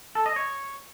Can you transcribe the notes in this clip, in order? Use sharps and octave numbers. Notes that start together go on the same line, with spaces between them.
A4
D#5
C#5